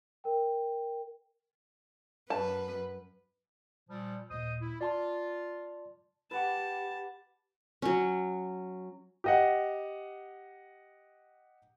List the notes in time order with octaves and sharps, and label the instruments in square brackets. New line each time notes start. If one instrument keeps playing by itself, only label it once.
[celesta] A#4 G5
[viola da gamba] F#2 B4 [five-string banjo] A5
[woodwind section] A#2 F3 G3
[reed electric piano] D#2 A#2 [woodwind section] C5 D#5 D#6
[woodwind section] E4
[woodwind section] F4 [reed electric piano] D5 A5 C6
[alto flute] G4 [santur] B4 F#5 D6 [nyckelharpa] A5
[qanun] F#3 C#4
[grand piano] G4 D#5 F#5